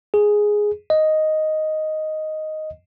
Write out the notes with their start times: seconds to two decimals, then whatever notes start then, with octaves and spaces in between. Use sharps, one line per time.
0.14 G#4
0.90 D#5